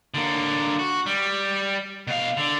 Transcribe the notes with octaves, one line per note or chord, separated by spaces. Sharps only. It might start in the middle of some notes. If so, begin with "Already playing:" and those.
D3 A#3
F#4
G3
B2 F5
D3